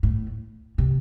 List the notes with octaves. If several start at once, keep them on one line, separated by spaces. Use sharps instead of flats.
A2
C3